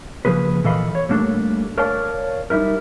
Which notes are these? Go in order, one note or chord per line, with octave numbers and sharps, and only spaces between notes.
C#3 E3 F3 A#3 G#4 B4
A#2 E3 A4 D#5 F5 B5
C#5
G3 A3 A#3 D4 A4
A#4 C#5 D5 F5 A5
G3 D#4 E4 A#4